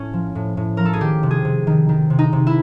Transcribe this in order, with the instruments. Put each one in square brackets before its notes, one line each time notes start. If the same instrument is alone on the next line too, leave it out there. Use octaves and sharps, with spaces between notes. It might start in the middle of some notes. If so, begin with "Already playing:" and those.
Already playing: [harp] A2 C#4
F3
A2
A2
F3 A#4
A4
G#4
D#3 G4
C3
G#4
C3
D#3
D#3
C3
D#4
C3
E4